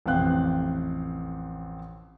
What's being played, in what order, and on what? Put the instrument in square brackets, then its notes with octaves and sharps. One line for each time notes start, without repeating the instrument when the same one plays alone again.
[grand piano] A1 F2 C3 F5 G5 F#6